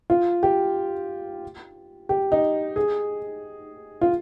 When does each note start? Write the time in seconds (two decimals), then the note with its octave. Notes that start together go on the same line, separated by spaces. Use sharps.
0.10 F4
0.43 G4
2.09 G4
2.32 D#4
2.76 G#4
4.01 F4